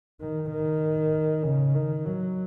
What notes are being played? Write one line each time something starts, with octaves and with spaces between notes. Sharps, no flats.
D#3
D#3
C#3
D#3
F#3